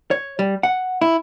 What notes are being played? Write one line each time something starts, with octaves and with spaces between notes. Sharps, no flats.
C#5
G3
F#5
E4